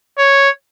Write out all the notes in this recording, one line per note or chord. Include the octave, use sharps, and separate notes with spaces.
C#5